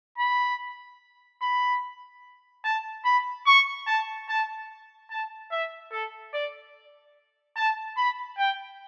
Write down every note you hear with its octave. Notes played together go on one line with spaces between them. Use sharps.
B5
B5
A5
B5
C#6
A5
A5
A5
E5
A4
D5
A5
B5
G5